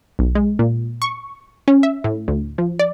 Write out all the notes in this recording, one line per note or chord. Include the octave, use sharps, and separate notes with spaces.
B1
G#3
A#2
C#6
C#4
E5
A2
D2
F3
D5